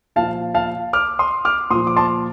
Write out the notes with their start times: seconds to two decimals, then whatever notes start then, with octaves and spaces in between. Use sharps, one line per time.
0.16 A#2 F3 F5 A5
0.54 F5 A5
0.93 D6 F6
1.19 C6 D#6
1.45 D6 F6
1.70 A#2 C6 D#6
1.75 F3
1.87 D6
1.97 A5 C6